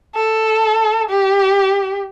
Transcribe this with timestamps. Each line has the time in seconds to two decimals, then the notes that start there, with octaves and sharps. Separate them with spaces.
0.15 A4
1.10 G4